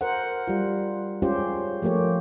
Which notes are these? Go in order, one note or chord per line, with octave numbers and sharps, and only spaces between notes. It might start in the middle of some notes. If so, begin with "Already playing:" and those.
A#4 C5 F#5
G3 F4
G#3 C#4 F4 G4 C5
F3 A3 A#3 G4 C#5